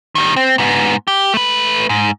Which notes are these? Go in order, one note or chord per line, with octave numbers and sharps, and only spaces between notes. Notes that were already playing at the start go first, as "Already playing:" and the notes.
D#3 G3
C4
G#2 B3
G4
A3 B4
G#2